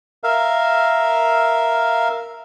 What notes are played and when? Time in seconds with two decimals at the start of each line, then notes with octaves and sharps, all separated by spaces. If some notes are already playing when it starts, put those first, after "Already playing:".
0.24 A#4 E5 F5